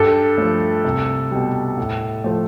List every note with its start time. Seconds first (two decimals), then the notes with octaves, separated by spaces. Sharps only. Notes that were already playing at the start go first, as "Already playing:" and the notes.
Already playing: G2 A4
0.38 F3 A3
0.85 C2
1.31 B2 G3
1.78 A2
2.24 F3 A3